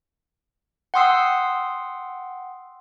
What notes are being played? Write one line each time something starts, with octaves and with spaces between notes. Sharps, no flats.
F#5 G5 C6 D#6 E6 C7